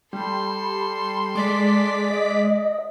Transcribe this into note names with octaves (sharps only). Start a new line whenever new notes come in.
G3 A4 C6
G#3 D5 D6 B6
D#5